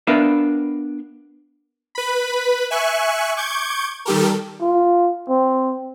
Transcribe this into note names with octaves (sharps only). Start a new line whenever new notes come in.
B3 D4 A#4 B4 E5 F5
B4 B5
E5 G#5 C#6 F#6
C#6 D6 G6 G#6
D#3 G3 G4 A4 A#4
F4
C4